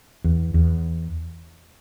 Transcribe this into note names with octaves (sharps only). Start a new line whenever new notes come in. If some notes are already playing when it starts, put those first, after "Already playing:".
E2
E2